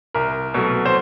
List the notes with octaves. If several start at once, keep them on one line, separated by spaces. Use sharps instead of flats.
C2 A#4
B2 F#3 A3
C5